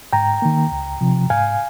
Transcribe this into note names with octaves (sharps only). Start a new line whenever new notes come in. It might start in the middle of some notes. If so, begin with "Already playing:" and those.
G#2 G5 A#5
D#3 A#3
C#2
C3 F3
G#2 F5 G#5